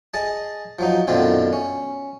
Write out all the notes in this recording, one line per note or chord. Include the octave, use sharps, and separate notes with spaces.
G#4 D#5 A5
F3 F#3 D#4
B1 F#2 D3 D#3 C4 F4
C#4